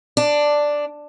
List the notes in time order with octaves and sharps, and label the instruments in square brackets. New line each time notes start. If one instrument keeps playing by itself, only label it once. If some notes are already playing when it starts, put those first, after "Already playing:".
[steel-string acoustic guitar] D4